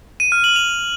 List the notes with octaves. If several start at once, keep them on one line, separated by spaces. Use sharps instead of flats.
D#7
F6
F#7
F7